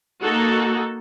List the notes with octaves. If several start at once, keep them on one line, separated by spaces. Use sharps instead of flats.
A#3 D#4 F#4 A4